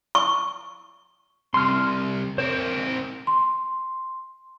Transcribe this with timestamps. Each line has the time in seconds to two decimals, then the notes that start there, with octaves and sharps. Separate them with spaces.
0.15 C#6
1.54 C2 C6 F6
2.38 C4 A#4 C5
3.27 C6